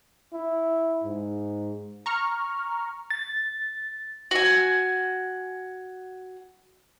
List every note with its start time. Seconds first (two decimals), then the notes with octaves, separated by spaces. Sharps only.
0.33 E4
1.04 G#2
2.06 A#5 C#6 F6
3.10 A6
4.31 F#4 G#5